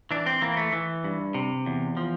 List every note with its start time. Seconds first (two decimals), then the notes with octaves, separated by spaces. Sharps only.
0.11 E3 D4
0.26 C4
0.42 E3 A#3
0.57 A3
0.72 E3
1.04 G2
1.34 C3
1.66 E2
1.97 F3